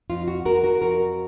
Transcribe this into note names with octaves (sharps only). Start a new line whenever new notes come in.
F2 F4
F#4
F2 F#4 A#4
F#4 A#4
F2 F#4 A#4